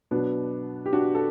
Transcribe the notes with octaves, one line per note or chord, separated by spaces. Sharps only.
B2 F#3 B3 D4
G4
D4 F#4
A4